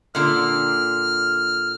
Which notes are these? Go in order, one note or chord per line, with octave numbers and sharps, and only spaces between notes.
A#2 D3 F6